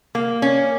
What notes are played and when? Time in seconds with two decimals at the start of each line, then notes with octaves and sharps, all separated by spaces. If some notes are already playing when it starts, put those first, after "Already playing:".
0.15 A#3
0.42 C#4